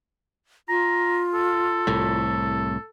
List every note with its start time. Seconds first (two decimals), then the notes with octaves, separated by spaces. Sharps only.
0.69 F4 A#5
1.34 A4
1.87 C2 A2